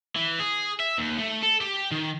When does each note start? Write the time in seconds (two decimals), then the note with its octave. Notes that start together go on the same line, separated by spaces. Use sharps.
0.16 E3
0.40 G#4
0.80 E5
0.99 D#2
1.18 A3
1.43 A4
1.61 G4
1.92 D#3